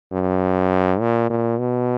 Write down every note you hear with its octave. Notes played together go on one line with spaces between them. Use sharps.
F#2
A#2
A#2
B2